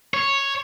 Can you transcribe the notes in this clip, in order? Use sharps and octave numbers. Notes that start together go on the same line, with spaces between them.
C#5